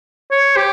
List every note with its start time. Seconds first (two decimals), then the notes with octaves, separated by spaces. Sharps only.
0.31 C#5
0.56 G4